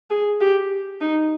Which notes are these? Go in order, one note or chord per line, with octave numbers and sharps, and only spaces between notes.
G#4
G4
D#4